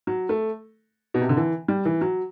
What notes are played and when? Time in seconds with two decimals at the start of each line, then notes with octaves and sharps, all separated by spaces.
0.07 F#3
0.29 A3
1.14 B2
1.21 C3
1.29 D3
1.37 E3
1.68 G3
1.85 E3
2.01 F#3